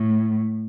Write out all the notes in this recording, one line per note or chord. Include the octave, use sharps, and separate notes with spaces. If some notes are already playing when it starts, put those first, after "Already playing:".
Already playing: A2